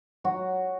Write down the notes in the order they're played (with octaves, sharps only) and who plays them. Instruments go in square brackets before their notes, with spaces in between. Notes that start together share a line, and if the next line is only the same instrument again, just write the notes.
[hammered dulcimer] F#3 F#4